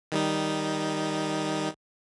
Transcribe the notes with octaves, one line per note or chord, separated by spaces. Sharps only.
D#3 G3 D#4